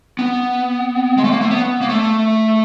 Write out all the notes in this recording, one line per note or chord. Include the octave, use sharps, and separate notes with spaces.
B3
G#3
A3
A#3
A3
B3
A#3
A3